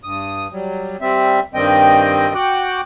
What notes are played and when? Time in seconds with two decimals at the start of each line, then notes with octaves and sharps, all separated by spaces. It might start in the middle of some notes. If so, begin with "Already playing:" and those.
0.04 G2 D#6
0.51 F#3 G3
1.01 G3 C4 E5
1.54 G2 D#3 G3 C4 D#5 G5
2.35 F#4 F#5 G5 D6 F#6